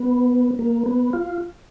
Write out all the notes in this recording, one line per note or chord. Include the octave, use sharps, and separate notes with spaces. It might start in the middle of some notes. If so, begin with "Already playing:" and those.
Already playing: B3
A#3
B3
F4